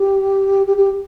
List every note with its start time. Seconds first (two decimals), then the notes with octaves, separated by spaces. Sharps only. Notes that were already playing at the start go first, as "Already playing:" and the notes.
Already playing: G4
0.67 G4
0.77 G4